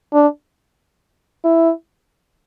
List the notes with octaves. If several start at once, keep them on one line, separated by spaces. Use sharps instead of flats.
D4
E4